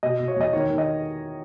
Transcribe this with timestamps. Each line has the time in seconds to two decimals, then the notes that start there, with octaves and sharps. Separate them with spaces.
0.03 B2 D#5
0.20 B2
0.28 C#5
0.36 E2 D#5
0.53 D#3 C#5
0.70 D#3
0.78 D#5